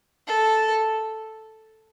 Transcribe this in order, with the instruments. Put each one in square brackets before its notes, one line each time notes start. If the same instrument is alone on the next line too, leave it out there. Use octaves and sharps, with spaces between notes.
[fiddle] A4